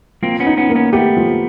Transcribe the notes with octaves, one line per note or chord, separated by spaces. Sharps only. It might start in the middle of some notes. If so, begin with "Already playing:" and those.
F3 A#3 C4
B3 C#4
D#4
B3 C#4
A#3
B3 C#4
A3 B3 G4
F3